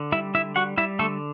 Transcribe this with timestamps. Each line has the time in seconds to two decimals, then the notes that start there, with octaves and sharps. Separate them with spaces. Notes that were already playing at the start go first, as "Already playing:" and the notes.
Already playing: D3
0.12 G3 E4 E5
0.34 D3 E4 E5
0.56 G3 F#4 F#5
0.77 G3 E4 E5
0.99 D3 A3 A4